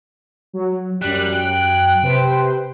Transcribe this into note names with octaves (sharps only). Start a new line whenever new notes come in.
F#3
F#2 G3 F#6
G5
C3 B4 C5